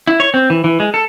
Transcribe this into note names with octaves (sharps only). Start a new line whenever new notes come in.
E4
C#5
C4
E3
E3
G#3
A4